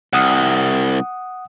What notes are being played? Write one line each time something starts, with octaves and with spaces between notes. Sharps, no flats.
C2 F#5 D#6